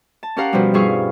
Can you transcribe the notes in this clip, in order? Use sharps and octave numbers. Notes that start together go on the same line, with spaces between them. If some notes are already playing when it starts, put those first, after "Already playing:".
A5
C#4 G4 A#4 F5 F#5
B2 F3 G3
G2 E4 F4 G#4 F5 C#6